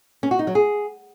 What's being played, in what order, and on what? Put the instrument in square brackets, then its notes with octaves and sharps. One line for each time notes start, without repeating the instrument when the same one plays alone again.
[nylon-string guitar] C#4
F#4
D#4
F#3
G#4